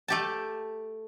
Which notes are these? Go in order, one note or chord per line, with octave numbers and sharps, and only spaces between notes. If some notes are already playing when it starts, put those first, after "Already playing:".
A3 G4 A5